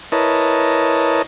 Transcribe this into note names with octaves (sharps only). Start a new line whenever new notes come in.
E4 A#4 B4 C#5 D#5 A5